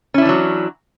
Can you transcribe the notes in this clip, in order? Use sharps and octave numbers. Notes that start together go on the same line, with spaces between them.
E3 F#3 C#4 D4 E4